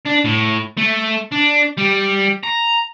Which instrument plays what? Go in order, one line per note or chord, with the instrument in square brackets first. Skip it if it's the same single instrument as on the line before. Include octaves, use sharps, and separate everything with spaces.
[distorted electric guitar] D4
A2
A3
D4
G3
A#5